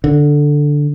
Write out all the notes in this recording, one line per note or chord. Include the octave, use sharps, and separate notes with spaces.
D3